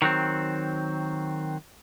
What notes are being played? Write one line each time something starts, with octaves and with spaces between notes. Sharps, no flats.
D#3 F#3 C4